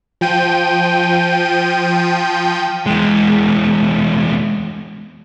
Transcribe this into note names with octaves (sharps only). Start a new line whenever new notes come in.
F3 G5 D#7
E2 G#3